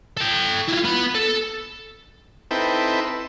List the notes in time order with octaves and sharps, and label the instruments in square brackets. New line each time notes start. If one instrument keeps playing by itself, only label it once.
[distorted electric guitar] A4 G5
E4 F4
B3 B5
A4
[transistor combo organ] C4 D#4 E4 A4 B4 G5